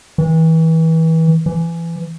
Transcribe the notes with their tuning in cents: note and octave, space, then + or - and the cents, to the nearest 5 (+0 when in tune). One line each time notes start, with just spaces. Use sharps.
E3 -30
E3 +25